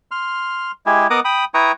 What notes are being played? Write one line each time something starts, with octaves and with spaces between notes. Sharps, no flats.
C6 F6
G#3 E4 G4 G#4
B3 A#4 D#5 F#5 D6 D#6
G5 B5 D#6
E4 B4 G5 A#5 C#6 D#6